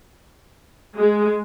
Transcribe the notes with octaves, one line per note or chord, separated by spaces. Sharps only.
G#3